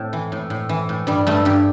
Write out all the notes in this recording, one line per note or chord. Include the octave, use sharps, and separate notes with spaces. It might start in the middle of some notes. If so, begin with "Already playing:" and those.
Already playing: A2 A3 C4
E3
A2
A2
E3
A2
G2 G3
G2 A3
G2 G4